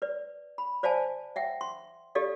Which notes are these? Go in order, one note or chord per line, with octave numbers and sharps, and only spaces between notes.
B4 D5
B5
C5 D5 F5 G#5 A5
E5 F#5 G5
C6
G4 A4 D5 D#5 F5